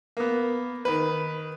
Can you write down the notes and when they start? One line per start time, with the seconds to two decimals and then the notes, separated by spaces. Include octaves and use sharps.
0.17 A#3 B3
0.85 D#3 B4